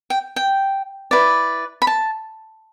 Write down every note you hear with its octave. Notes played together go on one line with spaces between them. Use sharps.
G5
G5
E4 B4 D5
B5
A5